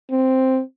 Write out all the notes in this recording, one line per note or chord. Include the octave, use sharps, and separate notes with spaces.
C4